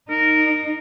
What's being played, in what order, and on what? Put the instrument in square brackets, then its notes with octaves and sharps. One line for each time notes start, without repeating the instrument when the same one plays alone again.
[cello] D#4 [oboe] A#4